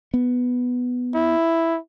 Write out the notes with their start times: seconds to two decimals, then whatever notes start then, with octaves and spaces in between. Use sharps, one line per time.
0.14 B3
1.14 E4